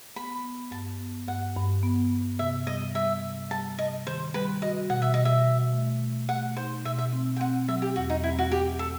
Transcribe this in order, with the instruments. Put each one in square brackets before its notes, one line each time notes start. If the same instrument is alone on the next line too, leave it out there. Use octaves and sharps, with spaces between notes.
[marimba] B3 [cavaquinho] B5
[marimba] B3
[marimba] G2 [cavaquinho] A5
[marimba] B3
[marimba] G2 [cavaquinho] F#5
[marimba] G2
B3
B3
[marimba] C3 [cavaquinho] E5
[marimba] G3 [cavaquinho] D#5
[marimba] G3 [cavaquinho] E5
[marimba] C3
[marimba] G3 [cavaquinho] A5
[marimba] C3 [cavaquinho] D#5
[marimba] D#3 [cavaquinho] C5
[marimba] G3 [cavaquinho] B4
[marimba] F#4 [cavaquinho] D#5
[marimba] B2 [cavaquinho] F#5
[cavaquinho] E5
[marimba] B2 [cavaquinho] D#5
[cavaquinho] E5
[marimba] F#4
A3
A3
[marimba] A3 [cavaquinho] F#5
[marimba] D#4 [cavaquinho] C5
[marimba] B2 [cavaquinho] E5
[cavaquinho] E5
[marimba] C4
[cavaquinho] G5
[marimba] C4 [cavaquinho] F#5
[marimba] F#3 [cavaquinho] E5
[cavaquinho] G4
[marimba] E2 [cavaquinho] F#4
[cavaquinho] D#4
[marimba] C4 [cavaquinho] E4
[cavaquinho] F#4
[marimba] F#3 [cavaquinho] G4
[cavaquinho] A4